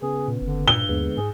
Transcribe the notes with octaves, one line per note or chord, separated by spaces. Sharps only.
C#3 B3 G#4
A#2
F#1 D3
G2 A#2 G7
D#2 D3 G#3 B3
G#2 G#4